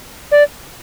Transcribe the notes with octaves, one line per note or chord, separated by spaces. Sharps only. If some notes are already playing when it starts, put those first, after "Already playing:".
D5